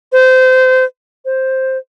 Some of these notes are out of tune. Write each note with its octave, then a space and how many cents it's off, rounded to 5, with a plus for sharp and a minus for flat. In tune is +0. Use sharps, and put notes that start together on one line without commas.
C5 -25
C5 +5